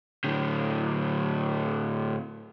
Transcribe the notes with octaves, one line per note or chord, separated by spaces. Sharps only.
A2 D3